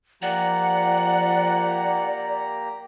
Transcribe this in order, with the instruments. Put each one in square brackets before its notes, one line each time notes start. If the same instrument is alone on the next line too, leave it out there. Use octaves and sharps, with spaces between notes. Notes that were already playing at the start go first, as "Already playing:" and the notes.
[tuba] F3 [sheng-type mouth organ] A#3 G4 A#5 [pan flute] D5 [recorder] F#5